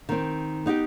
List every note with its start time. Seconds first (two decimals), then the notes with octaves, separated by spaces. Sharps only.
0.09 D#3 C4
0.66 B3 D#4 F4 G4